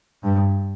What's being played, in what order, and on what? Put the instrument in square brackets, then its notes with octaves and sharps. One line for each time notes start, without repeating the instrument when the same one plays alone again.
[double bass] G2